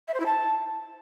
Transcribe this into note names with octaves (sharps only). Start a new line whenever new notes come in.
E5
C5
E4
A5